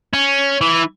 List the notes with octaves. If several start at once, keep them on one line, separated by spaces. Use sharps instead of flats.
C#4
E3